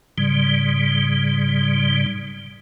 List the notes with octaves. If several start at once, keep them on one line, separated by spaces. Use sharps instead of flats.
G#2 C#3 G3